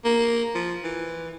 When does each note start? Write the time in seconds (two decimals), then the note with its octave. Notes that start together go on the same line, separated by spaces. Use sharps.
0.05 A#3
0.55 F3
0.84 E3